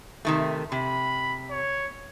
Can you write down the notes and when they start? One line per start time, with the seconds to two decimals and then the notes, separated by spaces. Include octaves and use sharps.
0.25 C3 D#3 A3
0.72 C3 B5
1.51 C#5